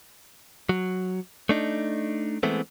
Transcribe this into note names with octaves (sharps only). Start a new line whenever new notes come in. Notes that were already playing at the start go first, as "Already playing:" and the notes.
F#3
A3 D4 D#4
E3 G#3 A3 B3 C4